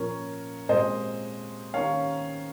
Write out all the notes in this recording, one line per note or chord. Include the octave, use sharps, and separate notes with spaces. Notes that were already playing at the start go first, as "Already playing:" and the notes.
Already playing: A#2 F3 A#3 C#4 A#4 C#5
A#2 G#3 C4 C5 D#5
D#3 A#3 C#4 C#5 F5